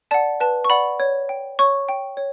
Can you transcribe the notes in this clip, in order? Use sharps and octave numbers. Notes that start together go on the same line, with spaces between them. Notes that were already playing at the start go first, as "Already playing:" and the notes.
D5 F#5 A5
B4 A5
C#6
D5 F#5 B5
C#5
G5
C#5 C#6
G5
C#5